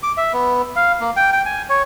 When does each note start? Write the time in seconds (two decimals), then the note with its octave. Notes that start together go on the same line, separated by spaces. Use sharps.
0.03 D6
0.17 E5
0.33 B3
0.76 F5
1.01 A#3
1.16 G5
1.33 G5
1.45 G#5
1.69 C#5